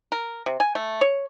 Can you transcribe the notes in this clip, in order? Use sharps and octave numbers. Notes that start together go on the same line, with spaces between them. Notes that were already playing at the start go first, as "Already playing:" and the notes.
A#4
C3
G#5
A3
C#5